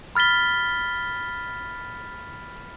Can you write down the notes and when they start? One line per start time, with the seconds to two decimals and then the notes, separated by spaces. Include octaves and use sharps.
0.15 B5 F6 A6 B6 G7